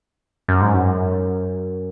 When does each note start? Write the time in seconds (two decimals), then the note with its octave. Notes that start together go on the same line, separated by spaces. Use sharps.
0.48 F#2
0.61 G#2
0.74 F#2